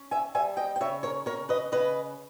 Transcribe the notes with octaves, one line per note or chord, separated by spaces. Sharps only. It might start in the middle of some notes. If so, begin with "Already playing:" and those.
Already playing: C#4
E5 G#5
G3 E5 G#5
D#5 G5
G5
C#3 C#5 E5
A#4 C#5
C#3 A#4 C#5
B4 D#5
C#3 B4 D#5